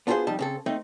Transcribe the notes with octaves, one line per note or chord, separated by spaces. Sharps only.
B3 D4 F4 F#4 G#4 C5
F2 G3 D#4 A5
C#3 C4 A4
A3 C4 D#4